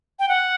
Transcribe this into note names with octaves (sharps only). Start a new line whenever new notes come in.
G5
F#5